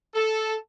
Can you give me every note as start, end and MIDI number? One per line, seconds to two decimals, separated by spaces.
0.15 0.56 69